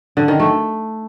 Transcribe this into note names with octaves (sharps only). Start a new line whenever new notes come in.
D3
D#3
A3